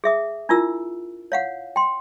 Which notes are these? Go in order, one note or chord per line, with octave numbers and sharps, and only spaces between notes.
G#4 E5 D#6
D4 E4 F4 A#4 E6
C#5 F5 F#5
G5 C6